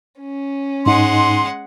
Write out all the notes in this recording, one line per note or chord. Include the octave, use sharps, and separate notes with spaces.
C#4
G#2 G#3 D#4 F#5 C6